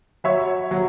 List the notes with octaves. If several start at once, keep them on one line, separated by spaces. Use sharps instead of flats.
F#3 C#5 E5
F#3